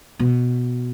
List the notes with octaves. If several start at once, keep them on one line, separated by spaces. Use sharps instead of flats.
B2